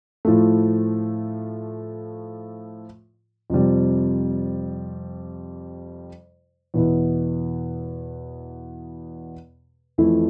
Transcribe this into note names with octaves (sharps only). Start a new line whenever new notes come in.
A2 F3 A3
F2 C3 G3
E2 B2 B3 E4
F2 E3 A3 E4